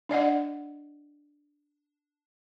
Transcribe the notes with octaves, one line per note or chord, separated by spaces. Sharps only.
D4 D5 D#5 F#5